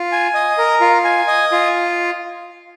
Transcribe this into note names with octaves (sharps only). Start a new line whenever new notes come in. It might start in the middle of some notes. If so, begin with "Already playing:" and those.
Already playing: F4
G#5
D#5
A#4
F4
G#5
D#5
F4